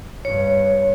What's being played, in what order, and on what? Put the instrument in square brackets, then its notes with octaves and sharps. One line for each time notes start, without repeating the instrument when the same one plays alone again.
[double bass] G2 [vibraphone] C#5